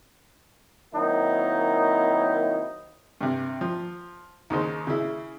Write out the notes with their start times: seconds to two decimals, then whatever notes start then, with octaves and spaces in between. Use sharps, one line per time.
0.94 D#3 F#3 A#3 C4 D#4 E4
3.21 G2 C3
3.61 F3
4.50 D#2 C#3 D#4 C5
4.87 C#3 E4